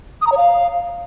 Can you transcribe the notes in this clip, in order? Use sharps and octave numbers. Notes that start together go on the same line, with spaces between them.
D#6
A#5
C#5
F5